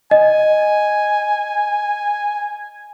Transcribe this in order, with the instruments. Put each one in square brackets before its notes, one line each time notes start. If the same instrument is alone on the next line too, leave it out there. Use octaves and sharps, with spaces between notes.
[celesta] D#5 [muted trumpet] G#5